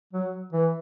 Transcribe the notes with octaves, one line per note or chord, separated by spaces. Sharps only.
F#3
E3